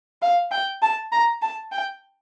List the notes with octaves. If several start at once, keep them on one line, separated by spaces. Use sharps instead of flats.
F5
G5
A5
A#5
A5
G5